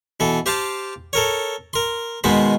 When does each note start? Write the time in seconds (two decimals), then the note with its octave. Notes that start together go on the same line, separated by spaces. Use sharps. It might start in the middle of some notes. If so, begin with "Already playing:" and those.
0.20 B2 E3 A4
0.46 G4 C5 F5 G5 A5
1.13 A4 A#4 C#5
1.73 A#4 C6
2.24 B2 D#3 G#3 B3 C5